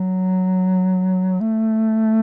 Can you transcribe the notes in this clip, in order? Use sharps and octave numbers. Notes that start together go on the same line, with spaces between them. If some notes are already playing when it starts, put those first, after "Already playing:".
Already playing: F#3
A3